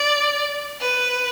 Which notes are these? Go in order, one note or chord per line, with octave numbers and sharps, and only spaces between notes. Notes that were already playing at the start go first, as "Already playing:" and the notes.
Already playing: D5
B4